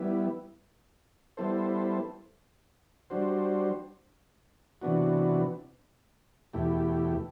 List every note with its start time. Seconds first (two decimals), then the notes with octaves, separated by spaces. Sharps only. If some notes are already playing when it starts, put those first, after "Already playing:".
Already playing: G3 B3 E4
1.37 G3 B3 E4 A4 C5
3.10 G3 D4 F#4 C5
4.82 C3 E3 B3 D4 F#4
6.53 E2 B2 A3 E4 G4